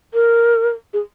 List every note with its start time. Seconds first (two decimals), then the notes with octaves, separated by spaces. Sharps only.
0.14 A#4
0.93 G#4